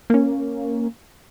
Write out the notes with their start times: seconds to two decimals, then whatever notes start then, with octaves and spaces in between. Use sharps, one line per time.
0.10 A#3 C#4